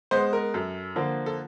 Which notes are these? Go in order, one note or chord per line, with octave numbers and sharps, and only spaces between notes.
G#3 B3 C5
A#4
F#2 A4
D3 F3 A#3
A4